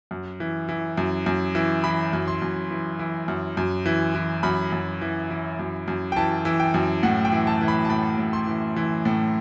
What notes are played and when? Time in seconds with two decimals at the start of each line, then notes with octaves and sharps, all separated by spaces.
0.11 F#2
0.40 E3
0.69 E3
0.98 F#2
1.26 F#2
1.55 E3
1.84 E3 B5
2.13 F#2
2.28 C6
2.42 F#2
2.71 E3
2.99 E3
3.28 F#2
3.57 F#2
3.86 E3
4.15 E3
4.43 F#2 B5
4.72 F#2
5.01 E3
5.31 E3
5.59 F#2
5.88 F#2
6.12 G5
6.16 E3 A5
6.45 E3
6.60 G5
6.74 F#2
7.03 A2 F#5
7.25 G5
7.32 E3
7.47 A5
7.61 E3
7.68 B5
7.85 A5
7.90 A2 B5
8.18 A2
8.33 C6
8.47 E3
8.76 E3
9.05 A2